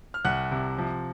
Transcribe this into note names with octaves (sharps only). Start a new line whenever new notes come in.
F6
C2 F#5 F#6
C3
F3